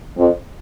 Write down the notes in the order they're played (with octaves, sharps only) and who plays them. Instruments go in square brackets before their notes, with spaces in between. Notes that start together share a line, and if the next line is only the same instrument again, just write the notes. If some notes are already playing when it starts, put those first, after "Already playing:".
[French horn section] F2